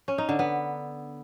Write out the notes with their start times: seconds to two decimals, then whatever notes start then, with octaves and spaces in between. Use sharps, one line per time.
0.08 C#4
0.18 D#4
0.29 D3
0.39 B3